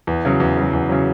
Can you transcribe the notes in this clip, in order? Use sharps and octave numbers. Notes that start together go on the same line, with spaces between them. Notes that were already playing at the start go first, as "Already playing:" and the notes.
E2
C#3 F#3
E2
C#3 F#3
E2
C#3 F#3